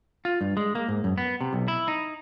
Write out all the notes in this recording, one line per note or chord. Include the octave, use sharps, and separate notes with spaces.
F4
G2
G#3
A#3
G#2
F#2
B3
C3
B1
E4
D#4